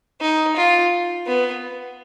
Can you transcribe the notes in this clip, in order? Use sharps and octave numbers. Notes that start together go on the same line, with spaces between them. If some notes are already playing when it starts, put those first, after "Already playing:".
D#4
F4
B3